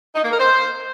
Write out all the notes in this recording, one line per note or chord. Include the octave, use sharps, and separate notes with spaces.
D#4
A#3
A#4
C5